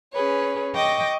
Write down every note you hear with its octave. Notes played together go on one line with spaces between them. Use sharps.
C#4 G#4 B4 C#5
D#5 G5 C#6 D6 A#6